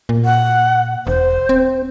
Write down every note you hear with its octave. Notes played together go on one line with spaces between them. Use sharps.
A#2
F#5
E1 C5
C4